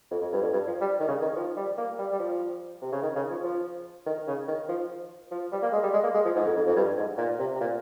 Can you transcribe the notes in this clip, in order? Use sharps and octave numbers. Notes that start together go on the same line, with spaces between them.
F2
F2
G2
F2
G2
F3
G3
D#3
C#3
D#3
F3
G3
A#3
G3
G3
F3
C3
C#3
D#3
C#3
F3
F3
D#3
C#3
D#3
F3
F3
G3
A#3
G#3
G3
G#3
A#3
G#3
F3
G#2
F2
F2
F2
G2
G#2
A#2
C3
C3
A#2